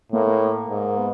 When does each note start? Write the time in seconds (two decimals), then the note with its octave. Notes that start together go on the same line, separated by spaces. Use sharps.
0.12 A2 A#3
0.27 A#3
0.69 G#2
0.97 B3